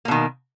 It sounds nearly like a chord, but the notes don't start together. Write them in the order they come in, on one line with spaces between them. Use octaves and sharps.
A#3 B2 D#3